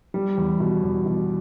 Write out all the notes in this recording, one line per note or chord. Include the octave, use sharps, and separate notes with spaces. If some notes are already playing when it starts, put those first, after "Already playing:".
G3
E2
B2
E2
B2